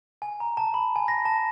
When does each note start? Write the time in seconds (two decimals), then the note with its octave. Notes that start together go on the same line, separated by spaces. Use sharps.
0.22 G#5
0.40 A#5
0.57 A5
0.74 B5
0.96 G#5
1.08 A#6
1.25 A5